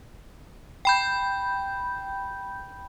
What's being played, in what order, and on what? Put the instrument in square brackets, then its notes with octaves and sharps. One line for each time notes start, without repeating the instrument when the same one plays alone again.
[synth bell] G5 B5 G6